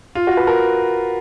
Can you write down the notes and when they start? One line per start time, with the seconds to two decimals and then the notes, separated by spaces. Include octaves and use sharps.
0.15 F4
0.27 F#4
0.37 B4
0.47 A#4